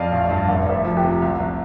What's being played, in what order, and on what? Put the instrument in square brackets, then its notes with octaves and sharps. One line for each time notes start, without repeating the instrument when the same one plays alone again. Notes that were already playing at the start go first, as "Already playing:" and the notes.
Already playing: [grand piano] F2 [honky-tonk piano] D5 F5
[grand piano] A1
G2
[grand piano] F1 [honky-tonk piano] F5
[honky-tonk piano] E5
D5
[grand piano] F1 [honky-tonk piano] C5 E5
[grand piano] F3 [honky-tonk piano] F4
[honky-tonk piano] G4
[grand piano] C3
C2
C2